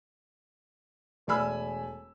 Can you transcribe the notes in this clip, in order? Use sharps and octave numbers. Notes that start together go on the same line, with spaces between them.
E1 A3 D5 G#5 B5 E6